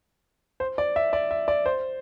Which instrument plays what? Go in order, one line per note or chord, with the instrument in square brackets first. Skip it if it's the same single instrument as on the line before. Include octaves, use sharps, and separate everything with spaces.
[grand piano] C5
D5
E5
D5
E5
D5
C5